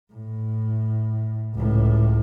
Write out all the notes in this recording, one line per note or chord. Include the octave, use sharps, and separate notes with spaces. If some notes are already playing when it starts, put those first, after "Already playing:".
A2
C#2 A2